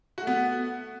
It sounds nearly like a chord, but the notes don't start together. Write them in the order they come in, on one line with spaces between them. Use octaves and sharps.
F#4 A3 B3